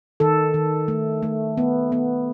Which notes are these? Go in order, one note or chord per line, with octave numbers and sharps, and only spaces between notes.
D#3 A4
D#3
A3
A3
B3
B3